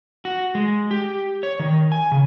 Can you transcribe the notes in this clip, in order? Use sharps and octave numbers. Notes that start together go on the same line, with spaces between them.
F#4
G#3
G4
C#5
D#3
G#5
C#3